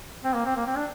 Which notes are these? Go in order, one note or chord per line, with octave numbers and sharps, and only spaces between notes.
C4
A#3
C4
A#3
C4
D4